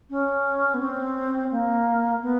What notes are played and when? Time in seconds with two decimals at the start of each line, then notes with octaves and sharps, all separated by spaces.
0.10 C#4
0.74 B3
0.80 C4
1.51 A#3
2.22 B3